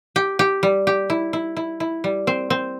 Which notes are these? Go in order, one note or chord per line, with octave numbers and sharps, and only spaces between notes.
G4
G4
G3
G4
E4
E4
E4
E4
G3
C4
C4